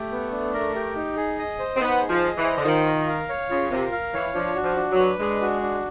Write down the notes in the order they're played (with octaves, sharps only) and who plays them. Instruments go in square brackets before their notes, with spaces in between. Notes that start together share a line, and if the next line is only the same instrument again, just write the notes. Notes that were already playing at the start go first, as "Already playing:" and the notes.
Already playing: [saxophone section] A3 [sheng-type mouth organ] G4
[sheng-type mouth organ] B3
D4
A#4
G4
D#4
G#4
D#5
C5
[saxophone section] C4
[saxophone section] B3 [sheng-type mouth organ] D#4
[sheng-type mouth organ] G#4
[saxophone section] F3
[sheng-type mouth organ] D#5
[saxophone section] E3
[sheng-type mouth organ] C5
[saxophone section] D3
[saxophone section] D#3 [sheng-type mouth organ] F4
[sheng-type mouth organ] A#4
F5
C#5
[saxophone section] C#3 [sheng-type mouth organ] F4
[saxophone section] C3 [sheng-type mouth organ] A#4
[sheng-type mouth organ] F5
[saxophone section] E3 [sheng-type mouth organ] C#5
[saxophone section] F3 [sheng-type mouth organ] D4
[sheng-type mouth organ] F#4
[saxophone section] F3
[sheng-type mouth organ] D4
[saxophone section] F#3
[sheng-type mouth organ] B4
[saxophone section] G#3 [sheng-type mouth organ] D4
[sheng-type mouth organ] F#4
D4